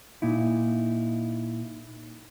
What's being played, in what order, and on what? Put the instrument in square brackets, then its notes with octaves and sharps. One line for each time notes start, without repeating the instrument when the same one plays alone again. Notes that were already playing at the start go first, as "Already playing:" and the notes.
[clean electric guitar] A#2 D#4 E4